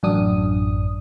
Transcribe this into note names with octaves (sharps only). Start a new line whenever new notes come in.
A1 F#2 D4 D#6